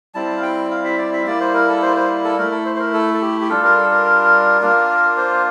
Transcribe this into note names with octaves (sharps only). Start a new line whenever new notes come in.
G3 C4 E4 A5
F5
G5
F5
E5
D5
E5
G3 A#3 E4 D5
C5
A#4
A4
C5
C5
A4
A3 E4 A#4
A4
C5
C5
A#4
A4
A4
G4
G4
G3 D4 F4 A4
A#4
A4
A#4
A#3 D4 F4
C5